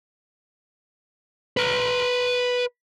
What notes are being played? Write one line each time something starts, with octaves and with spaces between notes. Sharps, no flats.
B4 A#5